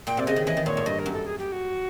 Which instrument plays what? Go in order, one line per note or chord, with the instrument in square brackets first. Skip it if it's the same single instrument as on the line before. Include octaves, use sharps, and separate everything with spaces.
[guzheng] A#2 [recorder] G5
[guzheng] C3 [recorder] D5
[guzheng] C#3 [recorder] D#5
[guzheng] D#3
[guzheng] E3 [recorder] D#5
[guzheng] D#3
[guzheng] A#2 [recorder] C#5
[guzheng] A2
[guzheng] G2 [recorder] D#5
[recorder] A#4
[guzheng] F#2
[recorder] A4
G#4
G4
F#4